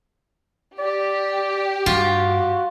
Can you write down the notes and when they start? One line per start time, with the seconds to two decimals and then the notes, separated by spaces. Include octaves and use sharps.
0.79 G4 D5
1.86 G2 F4 F#4